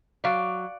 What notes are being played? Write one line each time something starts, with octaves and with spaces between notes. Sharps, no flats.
F#3 D5 F5